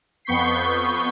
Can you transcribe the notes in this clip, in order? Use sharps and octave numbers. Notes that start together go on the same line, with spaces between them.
F2 B3 C#6 G6 B6 C7